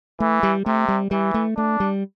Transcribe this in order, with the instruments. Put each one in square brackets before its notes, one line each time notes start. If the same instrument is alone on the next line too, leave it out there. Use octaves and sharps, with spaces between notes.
[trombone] E3 [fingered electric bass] A3
[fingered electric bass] G3
[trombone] C3 [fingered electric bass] A3
[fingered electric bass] G3
[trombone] E3 [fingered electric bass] G3
[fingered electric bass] A3
[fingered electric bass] A3 [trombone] D4
[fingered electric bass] G3